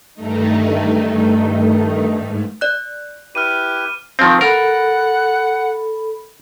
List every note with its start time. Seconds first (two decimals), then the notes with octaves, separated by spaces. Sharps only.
0.15 G2 D#3 A3 D#4
2.14 G#2
2.61 D5 F#6
3.35 E4 G4 B4 F6 D#7
4.19 D#3 F3 C4 F5 C6
4.41 A4 A#4 F#5 B5